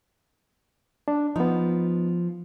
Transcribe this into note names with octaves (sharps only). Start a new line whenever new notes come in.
D4
F3 B3 D#4